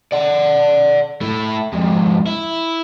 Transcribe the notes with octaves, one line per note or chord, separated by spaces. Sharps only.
D5 F#5
A3 E4
F2 G#2
E4